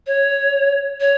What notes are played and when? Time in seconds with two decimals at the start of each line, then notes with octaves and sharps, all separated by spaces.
0.07 C#5
1.01 C#5